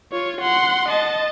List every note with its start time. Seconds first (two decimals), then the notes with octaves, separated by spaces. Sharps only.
0.12 F4 C#5
0.41 F#5 C6
0.89 D#5 A5